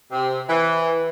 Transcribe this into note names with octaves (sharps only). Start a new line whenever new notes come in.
C3
E3